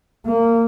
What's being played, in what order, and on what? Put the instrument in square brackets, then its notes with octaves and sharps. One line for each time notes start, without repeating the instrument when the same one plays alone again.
[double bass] A#3